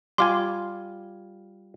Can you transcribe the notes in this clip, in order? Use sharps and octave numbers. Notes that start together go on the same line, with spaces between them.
G3 F4 G#5 C6 D6